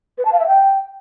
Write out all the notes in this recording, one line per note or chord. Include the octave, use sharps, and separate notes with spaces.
B4
A5
F5
E5
G5